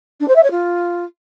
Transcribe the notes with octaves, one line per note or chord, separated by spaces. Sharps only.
D4
C5
E5
C#5
F4